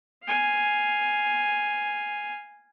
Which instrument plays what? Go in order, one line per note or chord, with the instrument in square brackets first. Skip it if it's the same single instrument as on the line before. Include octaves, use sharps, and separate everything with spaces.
[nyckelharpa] F5 G#5